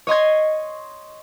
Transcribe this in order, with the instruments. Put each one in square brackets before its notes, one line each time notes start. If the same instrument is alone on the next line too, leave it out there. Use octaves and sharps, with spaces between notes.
[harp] C#5 D#5 C6 G#6